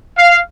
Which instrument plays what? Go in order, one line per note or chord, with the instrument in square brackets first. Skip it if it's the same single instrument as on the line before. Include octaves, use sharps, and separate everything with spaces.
[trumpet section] F5